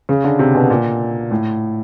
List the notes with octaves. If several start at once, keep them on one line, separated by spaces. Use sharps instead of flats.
C#3
D3
C3
B2
A#2
A2